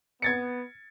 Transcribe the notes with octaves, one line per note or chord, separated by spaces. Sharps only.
B3 G#6 A6 C#7